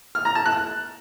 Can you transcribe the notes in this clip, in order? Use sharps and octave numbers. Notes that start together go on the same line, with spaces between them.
F6
A#5
A5
F#6